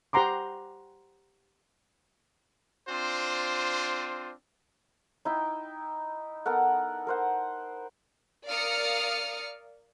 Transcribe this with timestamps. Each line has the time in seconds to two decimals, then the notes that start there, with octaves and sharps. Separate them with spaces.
0.13 G4 C5 F#5 A#5 C6 D6
2.89 C4 D4 F4 C5
5.25 D#4 E4 G5
6.46 B3 A4 A#4 F#5
7.07 A#4 C5 F#5
8.47 A#4 D5 F5 D#6 F6 C#7